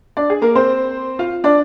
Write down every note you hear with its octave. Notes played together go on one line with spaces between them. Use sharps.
D4 D5
G#4
A#3 A#4
C4 C5
F4 F5
D4 D5